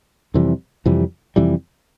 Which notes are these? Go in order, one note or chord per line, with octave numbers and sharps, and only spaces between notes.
F2 C3 E3 G3
F2 C3 E3 G3
F2 C3 E3 G3